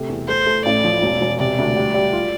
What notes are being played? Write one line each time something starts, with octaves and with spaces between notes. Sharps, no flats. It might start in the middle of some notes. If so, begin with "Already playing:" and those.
Already playing: C3 A3
E2
A3 C5
A3
A1 D5
F3
E1
E1
C3 D5
D2
G3
G3
F4